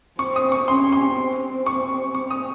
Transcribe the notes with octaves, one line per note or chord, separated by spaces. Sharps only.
C4 C#6
D#6
C#6
C#4 C6
C6
C4
C#6
C#6
D#6